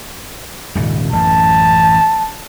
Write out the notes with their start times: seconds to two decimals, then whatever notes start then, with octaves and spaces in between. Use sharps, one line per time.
0.75 D#1 G#2 C#3
1.13 A1 F#2 A5